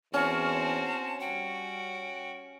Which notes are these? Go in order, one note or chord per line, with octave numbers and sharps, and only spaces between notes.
E2 C4 C#4 F#4 A5
G3 F#4 G5